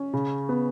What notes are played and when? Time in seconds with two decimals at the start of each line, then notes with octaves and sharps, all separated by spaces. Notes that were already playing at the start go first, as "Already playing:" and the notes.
Already playing: C#4
0.13 C#3
0.49 B3